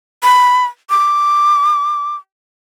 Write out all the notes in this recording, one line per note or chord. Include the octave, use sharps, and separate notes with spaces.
B5
D6